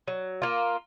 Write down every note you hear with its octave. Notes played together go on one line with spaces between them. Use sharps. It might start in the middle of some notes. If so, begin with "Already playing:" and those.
F#3
A#3 F4